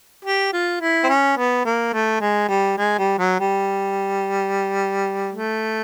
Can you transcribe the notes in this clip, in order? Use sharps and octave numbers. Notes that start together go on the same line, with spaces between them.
G4
F4
E4
C4
C#4
B3
A#3
A3
G#3
G3
G#3
G3
F#3
G3
A3